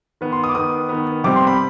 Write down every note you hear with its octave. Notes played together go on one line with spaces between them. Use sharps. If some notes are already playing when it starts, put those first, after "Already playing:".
D#3 B3
C6
D#6
D6
D#3 B3 D#6
D#3 B3
C3 G3 C4 D6
C6
B5